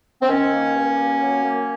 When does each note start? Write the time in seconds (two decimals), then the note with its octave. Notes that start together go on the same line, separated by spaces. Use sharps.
0.21 C4
0.28 D#3 C#4
0.51 A#3
0.75 G2
0.97 A#3
1.21 F#3
1.44 A#3